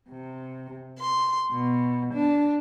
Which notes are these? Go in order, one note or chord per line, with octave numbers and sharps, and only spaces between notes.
C3
C6
B2
D4